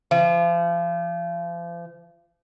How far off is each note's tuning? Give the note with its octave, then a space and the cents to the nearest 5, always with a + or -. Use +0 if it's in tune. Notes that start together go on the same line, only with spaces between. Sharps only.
F3 -35